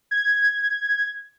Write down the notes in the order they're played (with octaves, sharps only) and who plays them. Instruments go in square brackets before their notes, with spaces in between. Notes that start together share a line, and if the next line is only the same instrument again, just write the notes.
[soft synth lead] G#6